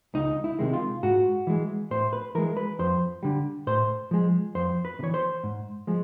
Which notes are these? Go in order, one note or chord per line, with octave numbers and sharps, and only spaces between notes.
C#2 D#4
E4
C3 D#3 G#3
F4
G#2 F#4
E3 G#3
A2 C5
B4
E3 G#3 A#4
B4
F2 C5
D3 G3
A2 C5
F3 G#3
F2 C5
B4
C3
E3 C#5
C5
G#2
F3 G#3